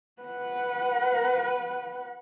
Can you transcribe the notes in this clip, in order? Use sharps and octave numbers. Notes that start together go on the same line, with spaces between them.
B4 F#5